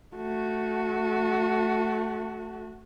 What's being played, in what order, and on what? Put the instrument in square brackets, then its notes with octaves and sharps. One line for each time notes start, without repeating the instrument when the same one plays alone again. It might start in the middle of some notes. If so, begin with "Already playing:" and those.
[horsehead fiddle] A3 F#4